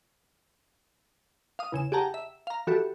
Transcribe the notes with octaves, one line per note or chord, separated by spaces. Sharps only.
F5 D#6
E2 C#3 E7
G4 G#4 F#5 G5 A5 A#5
E5
F5 A#5
E3 F#4 G4 A4